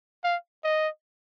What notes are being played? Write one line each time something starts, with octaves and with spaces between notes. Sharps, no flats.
F5
D#5